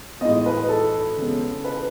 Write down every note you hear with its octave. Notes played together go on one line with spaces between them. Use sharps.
A2 G#3 B3 D#5
B4
A4
C#3 G#3 B3
B4